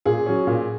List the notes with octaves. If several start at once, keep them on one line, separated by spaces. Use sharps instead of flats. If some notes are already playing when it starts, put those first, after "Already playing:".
A#2 G#4
F#3 C#4
A#2